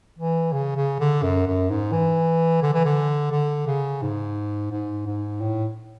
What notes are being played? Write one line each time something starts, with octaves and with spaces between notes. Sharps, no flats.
E3
C#3
C#3
D3
F#2
F#2
G#2
E3
D3
E3
D3
D3
C#3
G#2
G#2
G#2
A2